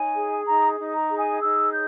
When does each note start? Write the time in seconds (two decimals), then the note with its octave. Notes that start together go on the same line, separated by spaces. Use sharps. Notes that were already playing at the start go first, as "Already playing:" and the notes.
Already playing: D#4 C#5 G#5
0.15 G#4
0.46 D#4 A#5
0.78 D#4
0.93 A#5
1.09 G#4
1.17 G#5
1.41 D#4 E6
1.72 C#5 G6